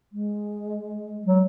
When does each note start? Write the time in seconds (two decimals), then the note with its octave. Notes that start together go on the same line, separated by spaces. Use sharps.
0.12 G#3
1.26 F#3